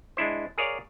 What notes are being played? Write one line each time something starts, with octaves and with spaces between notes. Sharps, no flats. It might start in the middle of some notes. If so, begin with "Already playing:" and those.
G#3 D4 E4 C5
G#4 A#4 C#5 D5 F5